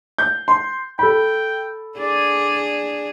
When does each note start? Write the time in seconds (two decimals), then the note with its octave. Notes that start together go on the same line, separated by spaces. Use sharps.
0.18 G6
0.48 C6
0.99 A4 G5 B5
1.99 D4 G#4 D5